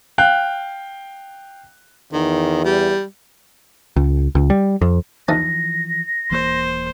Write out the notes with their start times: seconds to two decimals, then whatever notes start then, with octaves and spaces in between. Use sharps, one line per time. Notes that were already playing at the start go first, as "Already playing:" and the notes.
0.18 F5 G5 F#6
2.13 E2 D#3
2.65 G3
3.96 C#2
4.35 C#2
4.50 G3
4.81 F2
5.28 D#2 E3 F3 D#4 A5 A#6
6.31 D#1 E3 A#3 C5